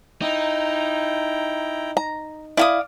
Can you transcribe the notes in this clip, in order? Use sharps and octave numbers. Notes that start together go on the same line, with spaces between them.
D#4 E4 G5 A#5
A#5
E4 D5 F5 D#6